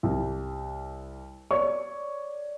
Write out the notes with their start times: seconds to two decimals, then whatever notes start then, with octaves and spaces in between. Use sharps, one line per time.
0.03 C2
1.51 C#5 D5 C#6